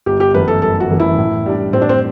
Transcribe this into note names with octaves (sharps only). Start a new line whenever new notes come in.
G1 G4
G4
F#2 E3 A3 B4
A4
G1 A4
F#4
F#2 E3 A3
E4
A2
G3 D4
A2 C4
D4
C4